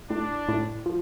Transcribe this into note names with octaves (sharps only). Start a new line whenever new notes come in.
A2 D4
A2
F3